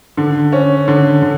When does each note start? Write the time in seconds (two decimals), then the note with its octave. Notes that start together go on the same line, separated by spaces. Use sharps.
0.17 D3
0.52 C#4
0.88 D3
1.22 D3